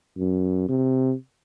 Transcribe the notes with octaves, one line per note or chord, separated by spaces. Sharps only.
F#2
C3